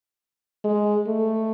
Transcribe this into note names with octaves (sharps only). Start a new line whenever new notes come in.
G#3
A3